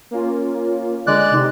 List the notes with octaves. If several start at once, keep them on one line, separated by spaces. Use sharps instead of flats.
A#3 C#4 F4
D3 G#3 D5 F#6
C3 D#4 G4